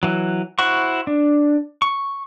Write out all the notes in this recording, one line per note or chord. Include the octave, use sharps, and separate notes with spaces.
E3 F#3
E4 F#4 C5 F#5 C#6
D4
C#6